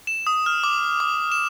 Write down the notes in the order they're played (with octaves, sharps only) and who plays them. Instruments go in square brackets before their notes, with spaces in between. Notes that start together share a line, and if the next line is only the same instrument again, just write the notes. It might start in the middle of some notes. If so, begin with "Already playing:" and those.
[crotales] E7
D#6
F6
D6
D6
E7